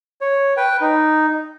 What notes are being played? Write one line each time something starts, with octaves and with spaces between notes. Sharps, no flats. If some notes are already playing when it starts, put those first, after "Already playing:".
C#5
B4 G5
D#4